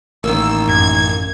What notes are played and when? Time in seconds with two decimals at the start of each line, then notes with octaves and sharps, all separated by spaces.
0.24 A1 D#3 A#3 E6
0.68 F#2 G#6